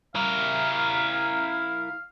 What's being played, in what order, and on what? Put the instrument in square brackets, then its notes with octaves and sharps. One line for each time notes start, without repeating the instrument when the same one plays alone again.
[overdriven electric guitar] E4 A#4 [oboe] F5